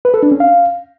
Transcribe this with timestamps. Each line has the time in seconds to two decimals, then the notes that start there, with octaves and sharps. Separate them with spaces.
0.05 B4
0.14 A4
0.23 D4
0.31 C#4
0.40 F5